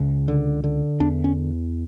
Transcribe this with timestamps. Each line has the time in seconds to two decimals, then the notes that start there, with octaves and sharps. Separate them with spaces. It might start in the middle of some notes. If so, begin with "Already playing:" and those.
Already playing: C#2 C#3
0.28 D3
0.64 D3
1.00 E2 D4
1.24 C#4